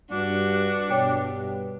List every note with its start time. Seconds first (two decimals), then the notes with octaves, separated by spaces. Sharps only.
0.11 G2 D4 F#4
0.91 G2 B2 C#5 G5